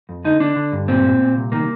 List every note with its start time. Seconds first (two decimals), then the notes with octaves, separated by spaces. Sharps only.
0.09 F2
0.25 D3 D#4
0.40 D3 D4
0.56 D3
0.72 G2
0.88 A#2 C4
1.04 A#2
1.20 A#2
1.36 C2
1.52 D#3 A#3